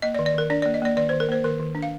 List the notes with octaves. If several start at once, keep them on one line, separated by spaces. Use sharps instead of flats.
A#3 D#5
D5
D#3
D5
D#3 A#4
D4 D5
A#3 D5
D#5
A#3 D5
D#3 D5
D#3 C5
A#4
A#3 C5
D#3 A#4
D#3
D4
F5